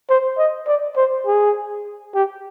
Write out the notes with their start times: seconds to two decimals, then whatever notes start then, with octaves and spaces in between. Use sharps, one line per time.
0.09 C5
0.38 D#5
0.67 D5
0.97 C5
1.27 G#4
2.15 G4